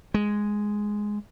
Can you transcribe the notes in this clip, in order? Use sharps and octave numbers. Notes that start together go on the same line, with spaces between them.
G#3